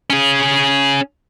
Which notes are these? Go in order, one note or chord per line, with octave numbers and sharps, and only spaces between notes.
C#4 G#4